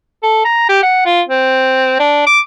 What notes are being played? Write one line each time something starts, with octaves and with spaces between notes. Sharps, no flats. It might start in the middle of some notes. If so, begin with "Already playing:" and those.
A4
A#5
G4
F#5
F4
C4
D4
D6